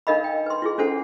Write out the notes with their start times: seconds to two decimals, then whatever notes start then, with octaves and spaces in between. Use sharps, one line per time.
0.07 D4 D#4 A#4 D#5 F5 B5
0.24 G5
0.46 B4 C6
0.62 E4 F4 G#4
0.78 C#4 D4 F4 A4 C5 F#5